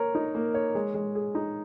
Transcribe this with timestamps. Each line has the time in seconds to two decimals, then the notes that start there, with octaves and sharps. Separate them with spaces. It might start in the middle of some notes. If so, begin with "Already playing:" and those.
Already playing: A#3 A#4 C#5
0.15 D#4
0.35 A#3
0.54 C#5
0.75 G#3
0.94 G#3
1.15 G#4
1.35 D#4